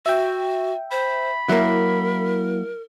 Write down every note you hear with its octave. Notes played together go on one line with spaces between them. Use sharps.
F#4 E5 G5
C5 B5
F#3 A#3 E4 A#4